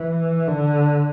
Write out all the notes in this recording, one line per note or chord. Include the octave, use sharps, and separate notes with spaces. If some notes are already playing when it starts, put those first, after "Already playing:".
Already playing: E3
D3